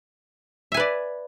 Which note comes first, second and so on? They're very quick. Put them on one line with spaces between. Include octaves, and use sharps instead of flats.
E5 G#5 B4 D5